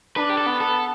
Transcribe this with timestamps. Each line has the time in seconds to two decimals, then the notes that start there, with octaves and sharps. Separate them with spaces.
0.16 D4 B4
0.30 G4
0.38 A4
0.46 B3
0.61 A4